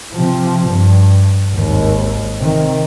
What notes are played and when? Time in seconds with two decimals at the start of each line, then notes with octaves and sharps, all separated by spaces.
0.13 C3 F3
0.69 G2
1.53 G#1 D#2
2.38 C3 D#3